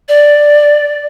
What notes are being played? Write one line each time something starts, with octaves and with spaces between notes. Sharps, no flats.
D5